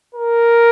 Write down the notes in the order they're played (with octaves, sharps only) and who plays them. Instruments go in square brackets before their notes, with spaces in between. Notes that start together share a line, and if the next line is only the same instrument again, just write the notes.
[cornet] A#4